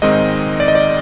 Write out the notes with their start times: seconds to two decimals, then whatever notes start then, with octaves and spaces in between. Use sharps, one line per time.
0.02 G#2 D#3 G#3 C4 D#5
0.60 D5
0.68 D#5
0.75 D5